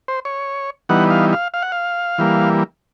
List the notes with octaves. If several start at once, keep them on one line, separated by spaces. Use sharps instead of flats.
C5
C#5
E3 G3 B3 D#4 F#5
F5
F5
F5
F#5
F5
E3 G3 A#3